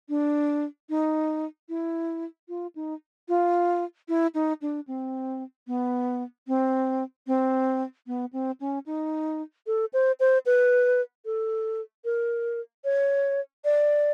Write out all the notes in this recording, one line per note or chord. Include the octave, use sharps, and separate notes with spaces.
D4
D#4
E4
F4
D#4
F4
E4
D#4
D4
C4
B3
C4
C4
B3
C4
C#4
D#4
A4
C5
C5
B4
A4
A#4
C#5
D5